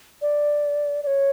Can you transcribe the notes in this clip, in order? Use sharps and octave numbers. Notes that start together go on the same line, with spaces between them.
D5
D5
C#5